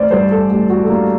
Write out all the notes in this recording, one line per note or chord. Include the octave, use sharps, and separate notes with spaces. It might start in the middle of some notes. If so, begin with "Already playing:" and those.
Already playing: A1 C5 D5
G2 D3 G3 C5
A4
A1 G4
F#4
A3
G2 D3 G3 A#3